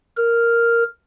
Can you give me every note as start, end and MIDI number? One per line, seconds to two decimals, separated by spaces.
0.17 0.84 70
0.17 0.84 89